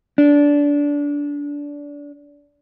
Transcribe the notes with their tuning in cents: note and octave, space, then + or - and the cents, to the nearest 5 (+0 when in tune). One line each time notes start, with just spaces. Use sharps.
D4 -20